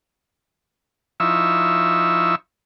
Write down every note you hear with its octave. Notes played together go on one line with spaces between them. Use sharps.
F3 D#4 E4 C#6 E6